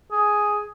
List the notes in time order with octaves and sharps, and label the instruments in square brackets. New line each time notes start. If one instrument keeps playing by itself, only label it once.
[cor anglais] G#4